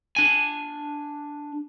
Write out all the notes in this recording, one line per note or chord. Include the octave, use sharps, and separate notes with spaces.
D4 G#5